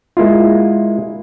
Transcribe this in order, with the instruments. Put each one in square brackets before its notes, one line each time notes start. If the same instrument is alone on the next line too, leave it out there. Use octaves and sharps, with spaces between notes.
[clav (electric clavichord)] G#3 A#3 E4 F4